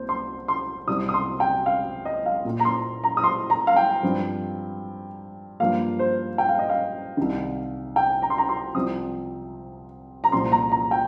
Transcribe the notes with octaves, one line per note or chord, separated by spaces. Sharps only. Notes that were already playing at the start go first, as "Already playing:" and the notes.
Already playing: C2 A#3 C5
C6
C6
C2 C3 G3 C4 D#6
D#6
C6
G5
F5
D#5
F5
A#2 A#3
A#5
C6
A#5
D#6
C6
A#5
F5
G5
G2 F3 C4
G2 F3 A#3 F5
C5
G5
F5
D#5
F5
C2 C3 D#3
G5
A#5
C6
A#5
C6
C2 C3 F3 C4 D#6
A#5
C2 A#2 F3 C4 C6
A#5
A#5
G5